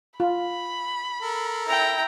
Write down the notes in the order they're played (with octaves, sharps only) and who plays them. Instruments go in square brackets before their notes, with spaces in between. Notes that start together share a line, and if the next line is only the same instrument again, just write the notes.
[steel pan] F4 [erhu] B5
[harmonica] A4 A#4
[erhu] E4 [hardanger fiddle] G5 A#5